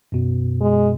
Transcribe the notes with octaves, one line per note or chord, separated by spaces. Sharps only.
F#2 B2
G#3